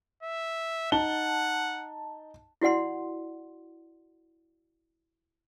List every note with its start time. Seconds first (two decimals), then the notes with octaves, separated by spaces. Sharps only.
0.23 E5
0.92 D#4 F#5 A5 G7
2.61 E4 F#4 D5 F#5 C6